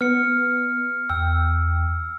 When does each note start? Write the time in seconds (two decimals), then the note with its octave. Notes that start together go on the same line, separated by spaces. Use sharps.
0.01 B3 F6 C#7
1.09 E2 G5 E6